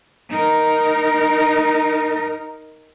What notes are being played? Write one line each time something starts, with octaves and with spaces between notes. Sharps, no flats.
D#4 A#4